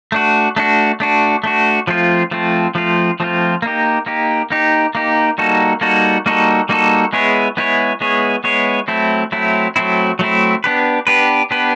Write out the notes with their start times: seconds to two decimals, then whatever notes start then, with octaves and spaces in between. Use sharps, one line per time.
0.12 A3 D4 F#4
0.56 A3 D4 F#4
1.00 A3 D4 F#4
1.44 A3 D4 F#4
1.87 F3 A3 C4 F4
2.31 F3 A3 C4 F4
2.75 F3 A3 C4 F4
3.20 F3 A3 C4 F4
3.62 A#3 D#4 G4
4.06 A#3 D#4 G4
4.50 A#3 D#4 G4
4.95 A#3 D#4 G4
5.38 G3 A#3 D#4 F#4 A4
5.81 G3 A#3 D#4 F#4 A4
6.26 G3 A#3 D#4 F#4 A4
6.69 G3 A#3 D#4 F#4 A4
7.13 G#3 B3 E4 G#4 C#5
7.57 G#3 B3 E4 G#4 C#5
8.01 G#3 B3 E4 G#4 C#5
8.44 G#3 B3 E4 G#4 C#5
8.88 F#3 A3 C4 E4
9.32 F#3 A3 C4 E4
9.76 F#3 A3 C4 E4
10.19 F#3 A3 C4 E4
10.64 B3 D4 G4 B4
11.07 B3 D4 G4 B4
11.51 B3 D4 G4 B4